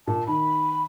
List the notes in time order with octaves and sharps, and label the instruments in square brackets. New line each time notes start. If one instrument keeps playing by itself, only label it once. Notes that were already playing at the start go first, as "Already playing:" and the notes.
[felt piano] A#2 [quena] A5
[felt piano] D#3 [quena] B5